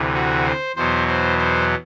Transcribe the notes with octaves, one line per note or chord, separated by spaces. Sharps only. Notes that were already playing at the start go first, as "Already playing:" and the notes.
Already playing: D2 C3 E3
F#4
C5
E2 B2 F#3 C5
C5
C5